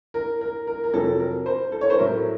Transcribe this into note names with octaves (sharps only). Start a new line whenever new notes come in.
A#4
A#4
A#4
A#4
F2 C3 F#3 A4
A#4
C5
A4
C#5
C5
A2 F#3 A3 A#4